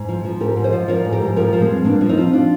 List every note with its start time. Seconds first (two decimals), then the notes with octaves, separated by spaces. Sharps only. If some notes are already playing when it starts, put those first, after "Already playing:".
Already playing: G#2
0.08 F3
0.25 F3
0.40 G#2 G4 A#4
0.56 G#2
0.64 C5 D#5
0.72 F3
0.88 F3 A#4 D5
1.05 G#2
1.12 G4 A#4
1.21 G#2
1.36 F3 G4 A#4
1.53 F3
1.61 G#3 C4
1.69 G2
1.85 G2 A#3 D4
2.01 F3
2.09 C4 D#4
2.17 F3
2.33 D4 F4